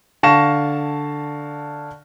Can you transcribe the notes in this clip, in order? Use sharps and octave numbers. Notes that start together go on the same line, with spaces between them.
D3 F5 A5 C#6 A#6 E7